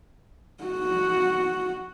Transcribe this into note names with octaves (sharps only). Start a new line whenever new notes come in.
F#4